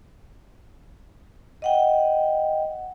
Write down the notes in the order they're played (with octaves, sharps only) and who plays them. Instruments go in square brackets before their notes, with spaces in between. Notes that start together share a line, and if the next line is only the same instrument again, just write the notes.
[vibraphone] D#5 F#5 G5